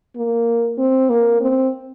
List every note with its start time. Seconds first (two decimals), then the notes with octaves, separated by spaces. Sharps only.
0.16 A#3
0.78 C4
1.10 A#3
1.41 C4